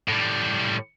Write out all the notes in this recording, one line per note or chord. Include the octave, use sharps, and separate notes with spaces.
A2 G3